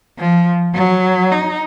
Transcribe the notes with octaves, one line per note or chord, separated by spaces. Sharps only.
F3
F#3
D#4